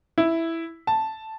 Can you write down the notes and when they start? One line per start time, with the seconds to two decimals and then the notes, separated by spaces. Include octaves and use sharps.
0.18 E4
0.87 A5